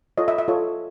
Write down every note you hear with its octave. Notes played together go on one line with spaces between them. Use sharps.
F4 A4 C#5 D#5
E5
E5
F4 A4 C#5